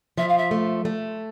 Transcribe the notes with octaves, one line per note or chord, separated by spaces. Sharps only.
F3 E5
F5
E5
A3
A3